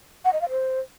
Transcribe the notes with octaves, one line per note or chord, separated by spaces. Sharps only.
F#5
D#5
F5
C5